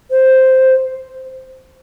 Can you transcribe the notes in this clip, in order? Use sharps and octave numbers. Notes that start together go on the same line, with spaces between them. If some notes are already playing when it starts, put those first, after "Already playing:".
C5